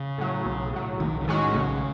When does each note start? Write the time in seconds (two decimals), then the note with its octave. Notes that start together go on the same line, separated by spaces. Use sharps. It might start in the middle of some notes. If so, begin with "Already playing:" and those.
Already playing: C#3
0.18 A2 F#3
0.45 B1
0.73 A2 F#3
1.00 B1 D#3
1.21 C#3
1.27 A2 D#3 G#3 C#4 F#4
1.55 B1 C#3